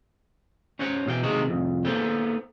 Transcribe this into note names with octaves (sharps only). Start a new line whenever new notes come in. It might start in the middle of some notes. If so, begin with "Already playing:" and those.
C#4 C5 C#5 F#5
B2 E3 F5 G5
C3 D#3 G#3 A#3 F#4
C2 F2
A#3 B3 A4 C5 G5